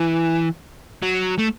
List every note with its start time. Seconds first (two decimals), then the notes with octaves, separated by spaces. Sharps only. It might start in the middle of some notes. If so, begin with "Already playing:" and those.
Already playing: E3
1.02 F#3
1.38 A3